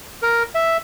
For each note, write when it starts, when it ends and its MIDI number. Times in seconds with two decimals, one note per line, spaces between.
0.22 0.43 70
0.55 0.77 76